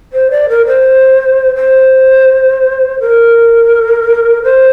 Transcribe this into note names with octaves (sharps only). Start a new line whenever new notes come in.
C5
D5
A#4
C5
C5
A#4
C5